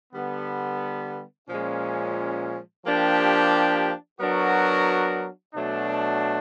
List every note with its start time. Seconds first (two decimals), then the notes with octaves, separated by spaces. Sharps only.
0.14 D3 G3 B3
1.49 A#2 F3 G#3 C#4
2.84 F3 A#3 D4 G4
4.19 F#3 B3 D4 F#4 A#4
5.54 B2 F#3 A3 D4